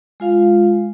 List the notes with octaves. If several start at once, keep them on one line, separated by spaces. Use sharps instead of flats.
G#3 F4 F5